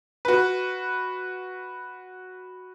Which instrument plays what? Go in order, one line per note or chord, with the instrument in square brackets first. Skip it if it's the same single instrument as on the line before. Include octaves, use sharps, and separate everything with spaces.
[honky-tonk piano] F#4 B4